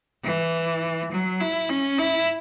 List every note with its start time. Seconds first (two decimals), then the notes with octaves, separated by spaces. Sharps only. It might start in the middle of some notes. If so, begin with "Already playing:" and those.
0.23 E3
1.11 F#3
1.40 E4
1.69 C#4
1.98 E4